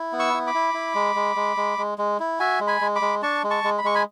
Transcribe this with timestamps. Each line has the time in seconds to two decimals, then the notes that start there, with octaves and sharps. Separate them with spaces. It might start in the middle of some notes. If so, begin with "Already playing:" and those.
Already playing: E4
0.13 B3
0.20 C#6 E6
0.34 E4
0.47 B5 D6
0.54 E4
0.74 E4
0.95 G#3
1.15 G#3
1.36 G#3
1.57 G#3
1.78 G#3
1.98 G#3
2.20 E4
2.39 F#4 E5 G#5
2.60 G#3
2.67 G#5 B5
2.81 G#3
2.95 B5 D6
3.02 G#3
3.22 D4 A5 C#6
3.43 G#3
3.50 A5 C#6
3.64 G#3
3.78 B5
3.84 G#3 C#6
3.95 G#5 B5